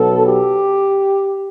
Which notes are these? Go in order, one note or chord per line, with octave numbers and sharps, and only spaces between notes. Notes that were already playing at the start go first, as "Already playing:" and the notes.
Already playing: B1 B2 F#3 B3 A4
G4